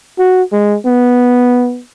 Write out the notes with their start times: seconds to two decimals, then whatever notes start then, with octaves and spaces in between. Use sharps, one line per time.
0.18 F#4
0.52 G#3
0.86 B3